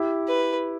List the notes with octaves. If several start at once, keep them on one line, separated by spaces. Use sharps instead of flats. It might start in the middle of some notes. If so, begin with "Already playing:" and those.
Already playing: E4 G4
B4